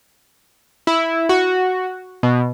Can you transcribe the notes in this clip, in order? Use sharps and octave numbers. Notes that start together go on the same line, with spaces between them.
E4
F#4
B2